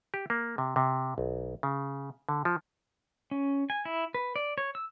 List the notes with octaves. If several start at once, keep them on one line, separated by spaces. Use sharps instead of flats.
G4
A#3
C3
C3
B1
C#3
D3
F3
C#4
G#5
E4
B4
D5
C#5
E6